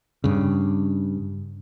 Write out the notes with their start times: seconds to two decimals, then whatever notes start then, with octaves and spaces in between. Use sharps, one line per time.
0.24 G2 C#3